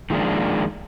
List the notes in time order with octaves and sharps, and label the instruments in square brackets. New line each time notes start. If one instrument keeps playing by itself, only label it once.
[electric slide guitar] D#3 F3 G#3 A#3 D4